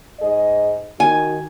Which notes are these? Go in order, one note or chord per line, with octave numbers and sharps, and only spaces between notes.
G#2 G#4 D#5
D#3 F#4 G#5